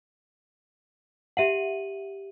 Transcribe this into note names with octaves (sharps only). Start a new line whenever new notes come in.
G4 E5 F#5 D#7 F#7